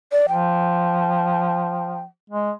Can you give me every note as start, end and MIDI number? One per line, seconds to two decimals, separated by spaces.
0.12 0.26 74
0.28 2.05 53
0.28 2.00 79
2.30 2.51 56